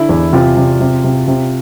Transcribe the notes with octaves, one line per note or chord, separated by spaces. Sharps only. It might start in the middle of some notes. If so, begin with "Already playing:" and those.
Already playing: D3 E4
E2
C3 F4
C3
C3
C3
C3